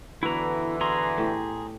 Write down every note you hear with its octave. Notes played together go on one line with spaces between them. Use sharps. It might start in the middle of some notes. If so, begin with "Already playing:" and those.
D3 E3 B3 E4 F#4 A#5
F#4 G#4 A#5 C6
A2 G4